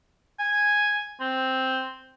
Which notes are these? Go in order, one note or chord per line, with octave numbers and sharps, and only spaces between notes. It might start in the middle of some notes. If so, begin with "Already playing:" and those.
G#5
C4